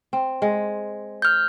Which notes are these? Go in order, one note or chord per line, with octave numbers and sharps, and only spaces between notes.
C4
G#3
F6 G6